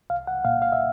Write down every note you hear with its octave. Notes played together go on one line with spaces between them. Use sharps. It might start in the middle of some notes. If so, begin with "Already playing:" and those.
C2 F5
F#5
A#2 F5
F5
E5